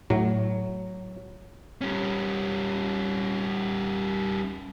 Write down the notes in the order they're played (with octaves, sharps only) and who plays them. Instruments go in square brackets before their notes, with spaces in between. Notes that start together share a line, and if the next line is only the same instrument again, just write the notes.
[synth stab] A2 [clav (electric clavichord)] F#3
[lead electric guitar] G3 C#4